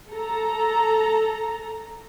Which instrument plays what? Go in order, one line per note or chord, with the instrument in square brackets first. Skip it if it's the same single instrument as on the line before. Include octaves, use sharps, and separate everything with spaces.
[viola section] A4 A#5